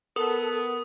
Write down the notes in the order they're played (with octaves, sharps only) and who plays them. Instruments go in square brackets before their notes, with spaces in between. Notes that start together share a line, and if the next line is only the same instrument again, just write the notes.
[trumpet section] B3 [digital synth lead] A4 [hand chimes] A#4 [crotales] D#6